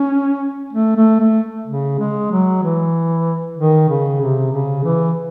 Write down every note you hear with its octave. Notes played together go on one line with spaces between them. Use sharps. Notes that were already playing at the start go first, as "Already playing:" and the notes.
Already playing: C#4
A3
A3
A3
C#3
G#3
F#3
E3
D#3
C#3
C3
C#3
E3